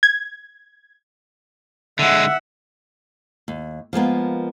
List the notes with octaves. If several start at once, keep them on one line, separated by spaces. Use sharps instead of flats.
G#6
D3 G#3 E5 F#5
D#2
F3 G#3 A#3 B3